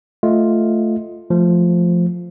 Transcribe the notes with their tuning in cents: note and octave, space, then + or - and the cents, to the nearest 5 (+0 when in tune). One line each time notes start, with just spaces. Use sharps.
A3 +0 F4 +0 D#5 +0
F3 +0 A3 +0